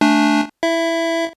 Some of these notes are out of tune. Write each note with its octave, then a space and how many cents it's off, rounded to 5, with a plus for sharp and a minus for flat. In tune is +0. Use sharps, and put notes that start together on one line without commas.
A3 +0 D4 +0 G#5 +0
E4 +0 E5 +15